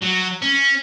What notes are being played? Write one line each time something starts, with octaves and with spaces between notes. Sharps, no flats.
F#3
C#4